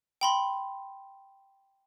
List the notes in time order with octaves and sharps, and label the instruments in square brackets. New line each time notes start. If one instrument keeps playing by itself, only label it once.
[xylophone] G5 B5 C6